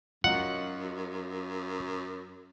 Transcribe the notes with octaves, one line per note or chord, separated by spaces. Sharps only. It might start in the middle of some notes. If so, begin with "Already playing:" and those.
F#2 F#3 D#4 F4 F#5